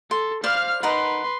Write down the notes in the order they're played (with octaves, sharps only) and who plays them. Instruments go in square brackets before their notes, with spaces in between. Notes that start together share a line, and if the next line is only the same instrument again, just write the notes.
[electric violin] A4 [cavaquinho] C6
[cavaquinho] C5 D5 B5 [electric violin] F5 F6
[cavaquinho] D#4 A#4 F#5 [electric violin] B4 C6